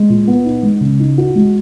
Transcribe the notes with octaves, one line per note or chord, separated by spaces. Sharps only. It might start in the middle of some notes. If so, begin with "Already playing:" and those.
Already playing: G#3
A#2
B3
D#4
G#3
C#3
D#4
F#4
G#3